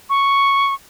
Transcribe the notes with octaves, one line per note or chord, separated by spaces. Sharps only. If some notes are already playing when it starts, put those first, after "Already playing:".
C#6